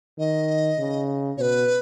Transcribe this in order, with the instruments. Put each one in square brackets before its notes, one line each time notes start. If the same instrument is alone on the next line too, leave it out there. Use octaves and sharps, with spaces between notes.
[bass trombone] D#3 [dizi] D#5
[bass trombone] C#3
[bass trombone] B2 [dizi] B4 C#5